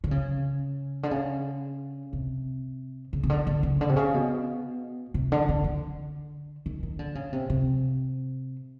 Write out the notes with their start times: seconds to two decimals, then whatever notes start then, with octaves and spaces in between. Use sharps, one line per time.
0.04 D3
0.11 C#3
1.03 D3
1.11 C#3
2.13 C3
3.13 C#3
3.23 C#3
3.30 D3
3.47 D3
3.63 C#3
3.81 D3
3.89 C3
3.96 C#3
4.14 B2
5.14 C3
5.32 D3
5.49 D3
5.64 D3
6.66 D#3
6.83 D#3
6.99 D3
7.15 C#3
7.33 C3
7.50 C3